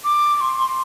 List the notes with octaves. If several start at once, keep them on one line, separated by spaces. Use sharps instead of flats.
D6
D6
C6